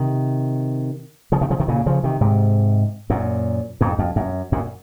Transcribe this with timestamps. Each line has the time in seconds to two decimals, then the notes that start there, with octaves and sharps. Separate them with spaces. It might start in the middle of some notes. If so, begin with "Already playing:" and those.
Already playing: C3 D#3
1.32 C#3 F3
1.41 C3 D#3
1.50 C#3 F3
1.60 C3 D#3
1.68 A#2 C#3
1.86 C#3 F3
2.04 C3 D#3
2.21 G#2 C3
3.10 F#2 A#2
3.81 F2 G#2
3.99 F2
4.16 F#2
4.52 F#2 A#2